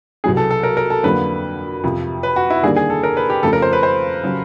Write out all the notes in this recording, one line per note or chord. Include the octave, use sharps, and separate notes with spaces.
C2 B2 F#3 B3 G#4
A4
A4
A#4
A#4
A4
F2 D3 F#3 A#3 B4
F2 C3 F3
B4
F#4
E4
D#2 D3 G3 A#3 D4 G#4
G#4
A4
A#4
B4
G4
F2 C#3 F3 A3 A4
A#4
C5
B4
C5
C#3 F#3